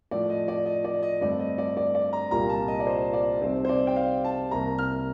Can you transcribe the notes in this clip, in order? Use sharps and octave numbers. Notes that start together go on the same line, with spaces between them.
A2 F3 A3 D5
D#5
D5
D#5
D5
D#5
G2 D3 A3 C4 D5
D#5
D5
D5
D5
A#5
C2 A#2 G3 A#3 F4 A#5
A5
D#5
D5
C5
D5
C2 C3 G3 C4 D#4 C5
C5
D5
G5
F5
A5
C2 C3 G3 A#3 A#5
F6